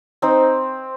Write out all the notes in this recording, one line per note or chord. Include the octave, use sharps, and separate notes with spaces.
C4 D#4 C5